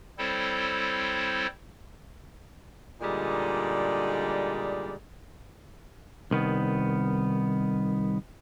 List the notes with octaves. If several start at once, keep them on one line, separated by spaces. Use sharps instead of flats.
G3 C4 E4 A4 C5 C#5
A#2 D3 G3 G#3 D#4 D5
C2 D#3 B3